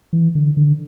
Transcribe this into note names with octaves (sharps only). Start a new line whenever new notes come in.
E3
D3
D3